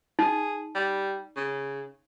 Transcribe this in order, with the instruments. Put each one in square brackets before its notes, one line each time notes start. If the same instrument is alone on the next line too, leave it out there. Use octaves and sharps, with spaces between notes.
[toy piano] D#4 [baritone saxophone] G#4
[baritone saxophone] G3
C#3